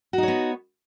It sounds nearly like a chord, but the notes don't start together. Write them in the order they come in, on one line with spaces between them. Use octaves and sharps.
F#4 D#4 C#5 B3